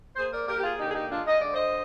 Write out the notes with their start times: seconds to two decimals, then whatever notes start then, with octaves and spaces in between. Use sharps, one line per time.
0.16 A#3 G#4 C5
0.31 A#4 D5
0.47 A#3 G4 A#4
0.57 G4
0.63 F4 G#4
0.79 D3 D#4 G4
0.89 G#4
0.94 D#4 G4
1.10 G#3 D4 F4
1.26 D#5
1.39 D3 D5
1.54 C5 D#5